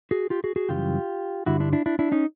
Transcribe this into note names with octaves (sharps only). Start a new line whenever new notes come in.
F#4 G#4
F4 G4
F#4 G#4
F#4 G#4
F#2 C#3 E3 G3 F4 G4
G2 D3 G3 E4 F#4
D4 E4
D4 E4
D4 E4
D4 E4
C#4 D#4